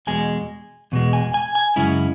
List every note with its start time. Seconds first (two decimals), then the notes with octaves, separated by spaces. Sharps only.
0.07 E2 B2 G#3 G#5
0.92 E2 B2 G#3
1.13 G#5
1.34 G#5
1.55 G#5
1.76 F#2 C#3 G#3 C#4 E4